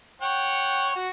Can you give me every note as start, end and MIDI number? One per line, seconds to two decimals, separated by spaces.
0.21 0.95 73
0.21 0.95 78
0.21 0.95 79
0.96 1.09 66